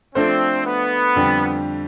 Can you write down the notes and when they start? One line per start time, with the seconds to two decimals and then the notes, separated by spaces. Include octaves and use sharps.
0.15 F3 A3 C4 D4 A4 C5
0.66 B3
1.16 F2 D3 G3 D4 G4